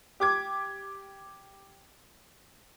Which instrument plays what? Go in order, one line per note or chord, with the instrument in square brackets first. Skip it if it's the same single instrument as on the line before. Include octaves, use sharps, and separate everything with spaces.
[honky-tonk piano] G4 D6 G#6